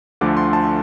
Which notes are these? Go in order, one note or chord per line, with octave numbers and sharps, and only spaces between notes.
D2 D3 F3 A3 D4 D6
C6
A5